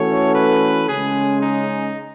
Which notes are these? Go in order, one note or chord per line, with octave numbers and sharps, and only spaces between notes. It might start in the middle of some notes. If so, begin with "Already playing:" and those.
Already playing: E3 A3 C#4 F#4 A4 C#5
B4
C#3 G#3 C#4 G#4
D#4